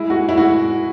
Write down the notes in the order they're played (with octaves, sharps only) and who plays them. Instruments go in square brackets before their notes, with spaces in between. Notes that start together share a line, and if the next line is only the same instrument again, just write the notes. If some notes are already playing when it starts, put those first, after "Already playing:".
Already playing: [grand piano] G#3 [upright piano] E4
[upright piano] F#4
E4
F#4